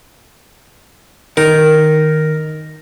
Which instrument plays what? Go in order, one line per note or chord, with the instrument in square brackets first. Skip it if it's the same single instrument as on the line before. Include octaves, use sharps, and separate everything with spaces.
[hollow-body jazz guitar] D#3 [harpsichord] A#4